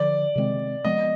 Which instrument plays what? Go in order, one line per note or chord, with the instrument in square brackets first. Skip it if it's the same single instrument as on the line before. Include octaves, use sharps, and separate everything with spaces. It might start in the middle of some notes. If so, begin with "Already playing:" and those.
Already playing: [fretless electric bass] D3 F3 [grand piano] D5
[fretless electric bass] C3 D#3 G#3 C4
[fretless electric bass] F3 G#3 B3 [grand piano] D#5